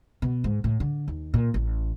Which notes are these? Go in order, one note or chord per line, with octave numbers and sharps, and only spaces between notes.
B2
G#2
A2
D3
D#2
A#2
A1